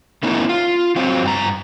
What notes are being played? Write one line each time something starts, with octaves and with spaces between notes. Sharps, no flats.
A3 B3 C#4 D#4 E4 A#4
F4
F#3 C4 F4
G2 F#4 A#5